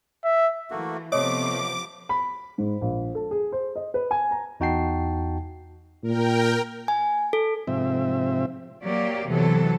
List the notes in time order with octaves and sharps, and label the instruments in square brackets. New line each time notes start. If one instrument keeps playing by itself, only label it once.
[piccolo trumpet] E5
[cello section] E3 [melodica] A3 A#3 F#4
[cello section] C3 F3 B3 [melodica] A3 [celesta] C#5 D#5 D#6 [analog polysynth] D6
[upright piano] B5
G#2
A#1
A4
G#4
C5
D#5
B4
G#5
A#5
[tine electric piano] E2 D#4 F#4 G5 A5 C7
[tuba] A#2 [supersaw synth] A#4 G5
[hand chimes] G#5
A4
[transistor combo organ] G#2 C3 F3 C4 E5
[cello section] F#3 A#3 G4 D5
C3 E3 F#3 B3 A4